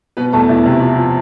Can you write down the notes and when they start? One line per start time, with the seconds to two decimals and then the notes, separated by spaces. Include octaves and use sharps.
0.17 B2 B3 B4
0.33 E2 A3 A4
0.49 E2 E4
0.65 C3
0.81 F3
0.98 F3